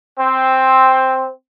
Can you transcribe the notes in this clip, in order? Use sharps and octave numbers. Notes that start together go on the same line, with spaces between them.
C4